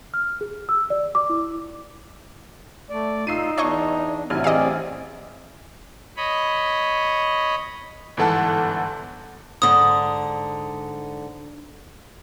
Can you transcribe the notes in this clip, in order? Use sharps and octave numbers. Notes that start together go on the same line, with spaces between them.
F6
G#4
E6
D5
D6
E4
A3 D5
D#4 F4 E6 C7 D#7
E2 D4 C#5 D#5 C#6
A1 C3 F#3 G#5 F6
C4 G#4 D5 D#5 F5
C#5 D#5 B5
G1 G#2 E3 A4 F#5 A5
G#2 D3 D#6